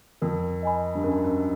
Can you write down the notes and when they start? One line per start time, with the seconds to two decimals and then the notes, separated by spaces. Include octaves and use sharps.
0.22 F2 A#4
0.63 D#5 G#5 B5
0.95 G2
1.04 F#2 A#4
1.24 F#2